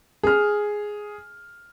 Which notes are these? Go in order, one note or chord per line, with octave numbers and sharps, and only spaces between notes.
G#4 F6